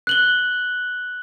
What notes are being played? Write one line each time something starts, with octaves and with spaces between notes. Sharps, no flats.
F#6 F#7 G7